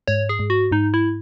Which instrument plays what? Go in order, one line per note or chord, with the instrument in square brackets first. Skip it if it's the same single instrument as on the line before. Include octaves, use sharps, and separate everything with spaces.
[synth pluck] G#2 [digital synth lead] C#5
[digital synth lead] G#4
[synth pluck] G#2
[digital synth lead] F#4
[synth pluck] G#2 [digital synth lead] D#4
[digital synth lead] E4